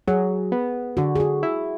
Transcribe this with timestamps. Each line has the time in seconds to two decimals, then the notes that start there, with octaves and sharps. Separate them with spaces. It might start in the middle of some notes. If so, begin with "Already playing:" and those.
0.07 F#3 G#4
0.52 B3
0.97 D3 F#4
1.15 G#4
1.20 F#4
1.43 E4